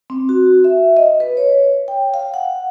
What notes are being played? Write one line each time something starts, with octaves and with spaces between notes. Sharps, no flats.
C4
F#4
E5
D#5
B4
C#5
G5
F5
F#5